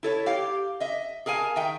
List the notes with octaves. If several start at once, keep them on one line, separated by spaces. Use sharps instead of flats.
E4 A4 C#5
G4 F5
D#5 E5
G#4 A#4 F5 G#5 A5
D#3 E5 G5